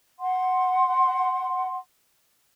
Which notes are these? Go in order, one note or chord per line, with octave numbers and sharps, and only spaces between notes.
F#5 C6